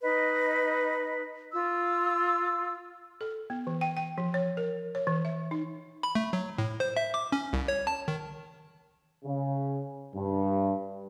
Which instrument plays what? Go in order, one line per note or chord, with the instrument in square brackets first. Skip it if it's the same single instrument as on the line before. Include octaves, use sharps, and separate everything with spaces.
[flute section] D#4 B4 D#5
F4 E6
[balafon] A4
B3
E3
G5
G5
F3
C#5
A#4
C#5
E3
E5
D#4
[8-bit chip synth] B5
A3
F#3
A2
C5
E5
D6
C#4
C2
C#5
A5
D#3
[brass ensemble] C#3
G2